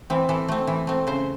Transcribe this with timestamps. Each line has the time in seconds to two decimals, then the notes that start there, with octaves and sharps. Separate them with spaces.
0.10 E3 C4
0.29 E3 A4
0.48 A3 C4
0.67 E3
0.87 A3 C4
1.07 C#3 C5